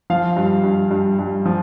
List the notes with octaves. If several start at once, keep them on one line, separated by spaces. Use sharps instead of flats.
F3 F5
G2
G2
G2
G2
F3